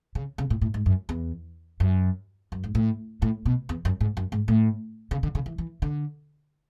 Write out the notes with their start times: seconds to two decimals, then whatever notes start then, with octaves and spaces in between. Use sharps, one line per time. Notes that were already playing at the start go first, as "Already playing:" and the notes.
0.15 C#3
0.38 C#3
0.50 A2
0.61 A2
0.74 G#2
0.86 F#2
1.09 E2
1.80 F#2
2.52 F#2
2.64 G#2
2.75 A2
3.22 A2
3.46 B2
3.69 E2
3.85 F#2
4.01 G#2
4.17 F#2
4.32 G#2
4.48 A2
5.11 C#3
5.23 D3
5.35 C#3
5.46 E3
5.58 E3
5.82 D3